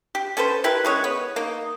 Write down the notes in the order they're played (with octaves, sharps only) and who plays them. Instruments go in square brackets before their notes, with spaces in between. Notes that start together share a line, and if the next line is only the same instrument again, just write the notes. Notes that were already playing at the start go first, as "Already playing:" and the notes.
[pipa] G4
C#4 A4 B4 C5
E4 G4 A#4 B4
C#3 G#3 C#5
B3
A#3 D#4